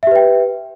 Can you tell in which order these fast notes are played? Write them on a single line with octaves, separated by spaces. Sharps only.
E5 G4 B4 G5